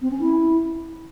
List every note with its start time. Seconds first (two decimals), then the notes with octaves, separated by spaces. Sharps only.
0.02 C4
0.11 C#4
0.20 E4